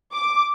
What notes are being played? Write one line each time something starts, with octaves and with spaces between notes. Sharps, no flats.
D6